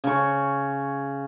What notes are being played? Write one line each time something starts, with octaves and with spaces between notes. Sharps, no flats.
C#3 C#6